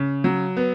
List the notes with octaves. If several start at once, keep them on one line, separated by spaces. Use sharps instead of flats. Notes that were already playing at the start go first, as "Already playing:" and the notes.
Already playing: C#3
F#3
B3